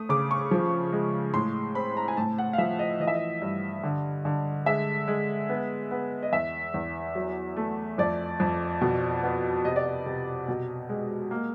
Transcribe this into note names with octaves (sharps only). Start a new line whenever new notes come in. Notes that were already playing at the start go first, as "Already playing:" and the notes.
Already playing: A3 D#6
C#3 D6
C#6
F3
G#3
A2 C6
C4 B5
A#5
G#5
A2 A5
F#5
F5
F3 E5
D#5
E3 D#5
E5
D#5
G2
D3
D3
G#3 E5
G#3
B3
B3
D#5
E2 E5
E2
F#3
A3
F2 D5
F2
B2
B3
C3 D#5
D5
D#5
C3
B2
G#3
A#3